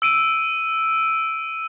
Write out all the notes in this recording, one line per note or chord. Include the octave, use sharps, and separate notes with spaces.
E6 D7 D#7